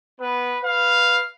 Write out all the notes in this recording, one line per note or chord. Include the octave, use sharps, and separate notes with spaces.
B3 B4
B4 F5